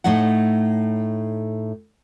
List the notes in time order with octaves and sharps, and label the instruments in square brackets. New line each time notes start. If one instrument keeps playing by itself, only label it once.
[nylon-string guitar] A2 A3 D#4 C#5 F#5